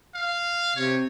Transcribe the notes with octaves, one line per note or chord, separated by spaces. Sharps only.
F5
C3 C#5